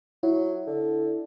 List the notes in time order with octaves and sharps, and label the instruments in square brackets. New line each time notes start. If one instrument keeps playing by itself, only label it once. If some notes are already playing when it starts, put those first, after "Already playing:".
[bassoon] F#3 [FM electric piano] E4
[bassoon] D3